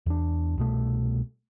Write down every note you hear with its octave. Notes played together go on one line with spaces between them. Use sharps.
E2 D4
C2 B2 A3